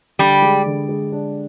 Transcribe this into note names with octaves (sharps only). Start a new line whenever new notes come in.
D3 G3
G#3
D3
G#3
D4